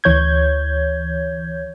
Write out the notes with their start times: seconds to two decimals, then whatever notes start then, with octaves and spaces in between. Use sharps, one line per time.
0.04 D2 E3 C#5 G6 G#6